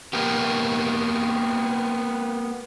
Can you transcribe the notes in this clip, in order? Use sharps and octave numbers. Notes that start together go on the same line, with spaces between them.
A#3 B3 G4